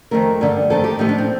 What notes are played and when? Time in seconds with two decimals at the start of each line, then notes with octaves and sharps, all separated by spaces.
0.11 F2 D#3 A3 A#4
0.41 G2 D3 A3
0.70 F2 D#3 A3 A4
0.84 G4
0.99 A2 F3 A3 D#4
1.09 D4
1.18 C4